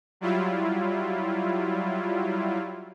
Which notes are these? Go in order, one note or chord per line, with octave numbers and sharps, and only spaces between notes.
F#3 G3 E4 F4